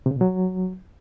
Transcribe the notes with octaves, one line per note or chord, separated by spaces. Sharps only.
C3
C#3
B2
F#3